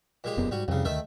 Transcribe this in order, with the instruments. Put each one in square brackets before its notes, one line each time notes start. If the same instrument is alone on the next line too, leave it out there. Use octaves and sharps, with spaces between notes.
[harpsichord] A#2 G#3 G4
[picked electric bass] E1 F#2 B3
[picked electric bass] G#2 [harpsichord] G3 F#4
[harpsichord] C2 C#3 [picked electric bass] F2
[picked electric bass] D2 [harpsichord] D#3 A3 E5